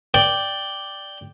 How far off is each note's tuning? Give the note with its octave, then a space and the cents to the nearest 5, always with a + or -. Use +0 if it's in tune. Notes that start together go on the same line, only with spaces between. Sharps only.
D5 +0 G5 +0